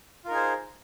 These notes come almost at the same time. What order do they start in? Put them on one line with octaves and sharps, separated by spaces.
F4 A#4 D#4 G#4 C5